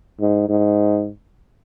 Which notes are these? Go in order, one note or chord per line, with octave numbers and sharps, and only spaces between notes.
G#2
G#2